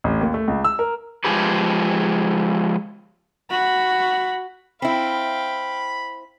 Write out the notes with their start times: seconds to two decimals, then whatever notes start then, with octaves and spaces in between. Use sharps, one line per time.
0.04 A1
0.21 D#2
0.34 A3
0.48 C#2
0.64 E6
0.79 A#4
1.24 F3 G#3 G4 G#4 B4
3.50 F#4 B5
4.82 C4 E4 F5 G5 B5